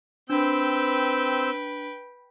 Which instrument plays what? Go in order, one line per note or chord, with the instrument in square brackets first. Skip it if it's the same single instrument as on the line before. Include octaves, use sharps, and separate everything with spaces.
[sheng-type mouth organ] C4 E6 G6 [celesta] D4 [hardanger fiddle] B4 G5